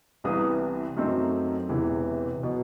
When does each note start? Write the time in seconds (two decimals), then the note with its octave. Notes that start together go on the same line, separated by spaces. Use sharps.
0.24 C2 C3 E3 B3 D#6
0.97 F#2 F#3 A3 C4 D#4
1.69 E1 E2 C3 E3
2.43 B2 F#3 B3